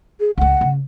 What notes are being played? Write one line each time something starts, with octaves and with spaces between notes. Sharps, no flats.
G#4
C#2 G#3 F#5
C#3